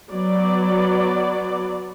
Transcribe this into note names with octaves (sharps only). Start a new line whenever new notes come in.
F#3 B3 D5